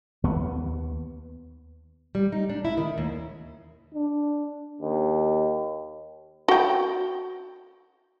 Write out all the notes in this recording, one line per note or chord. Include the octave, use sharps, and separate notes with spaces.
D#2 B3
G3
D#4
D4
E4
D#3
D#2
D4
D#2
F#4 G5